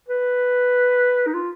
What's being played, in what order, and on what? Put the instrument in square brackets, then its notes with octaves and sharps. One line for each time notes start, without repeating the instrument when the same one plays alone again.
[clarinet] B4
D#4
F4